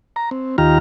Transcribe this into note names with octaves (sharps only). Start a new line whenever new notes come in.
A#5
C4
D#2 D#3 F4 G4 A#5 F6